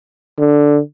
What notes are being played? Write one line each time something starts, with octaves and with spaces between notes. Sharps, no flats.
D3